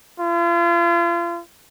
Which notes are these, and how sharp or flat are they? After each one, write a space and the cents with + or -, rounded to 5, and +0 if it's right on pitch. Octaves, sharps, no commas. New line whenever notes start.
F4 -40